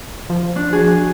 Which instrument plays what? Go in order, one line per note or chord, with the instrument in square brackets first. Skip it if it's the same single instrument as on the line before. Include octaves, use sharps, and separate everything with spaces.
[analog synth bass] F3
[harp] D4
F#4 G#4